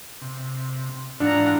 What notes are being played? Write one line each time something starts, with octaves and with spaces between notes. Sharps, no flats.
C3
G#2 E3 D4 F4 F#5 A#5